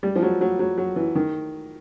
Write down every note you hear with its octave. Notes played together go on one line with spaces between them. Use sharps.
G3
F3
F#3
F#3
F#3
F#3
E3
D#3